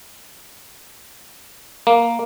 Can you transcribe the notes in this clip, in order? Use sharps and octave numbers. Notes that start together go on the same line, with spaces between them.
A#3